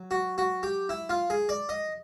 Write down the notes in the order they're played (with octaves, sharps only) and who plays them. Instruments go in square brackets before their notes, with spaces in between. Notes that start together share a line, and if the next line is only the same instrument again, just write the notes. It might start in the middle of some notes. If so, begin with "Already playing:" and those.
Already playing: [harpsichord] F#3
F#4
F#4
G4
E4
F4
G#4
D5
D#5